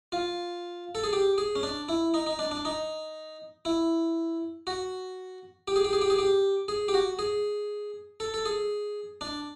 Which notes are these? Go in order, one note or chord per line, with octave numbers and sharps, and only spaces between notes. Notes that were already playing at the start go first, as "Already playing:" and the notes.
F4
A4
G#4
G4
G#4
C#4
D4
E4
D#4
D#4
D4
D4
D#4
E4
F#4
G4
G#4
G4
G#4
G4
G#4
G4
G#4
G4
F#4
G#4
A4
A4
G#4
D4